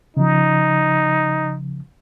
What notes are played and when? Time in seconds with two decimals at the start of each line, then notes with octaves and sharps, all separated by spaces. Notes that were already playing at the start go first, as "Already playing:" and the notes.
0.17 C#3 F3 D#4